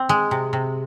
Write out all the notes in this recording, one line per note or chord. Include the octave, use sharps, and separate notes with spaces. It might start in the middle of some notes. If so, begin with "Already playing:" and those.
Already playing: C4
G#3
C3
C3